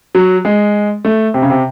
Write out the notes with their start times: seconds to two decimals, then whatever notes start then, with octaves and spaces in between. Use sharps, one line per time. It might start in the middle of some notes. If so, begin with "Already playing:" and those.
0.15 F#3
0.45 G#3
1.05 A3
1.34 C3
1.42 C#3
1.50 C3